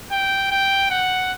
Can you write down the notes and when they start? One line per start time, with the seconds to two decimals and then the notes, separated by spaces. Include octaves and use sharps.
0.12 G5
0.52 G5
0.90 F#5